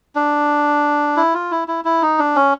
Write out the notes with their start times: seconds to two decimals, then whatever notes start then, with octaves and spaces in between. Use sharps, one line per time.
0.15 D4
1.16 E4
1.34 F4
1.51 E4
1.68 E4
1.85 E4
2.02 D#4
2.19 D4
2.36 C#4